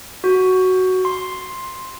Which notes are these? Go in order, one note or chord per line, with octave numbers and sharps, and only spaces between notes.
F#4
C6